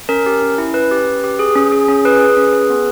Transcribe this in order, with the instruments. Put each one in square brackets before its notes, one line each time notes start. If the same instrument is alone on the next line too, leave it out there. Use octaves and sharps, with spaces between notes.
[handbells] C#4 A#4
G4
C#4
E4
C#4 B4
G4
C#4
G4
G#4
C#4
G#4
C#4
G#4 B4
G#4
C#4
G#4
B3